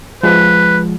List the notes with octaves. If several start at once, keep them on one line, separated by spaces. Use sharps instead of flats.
F3 G#3 B4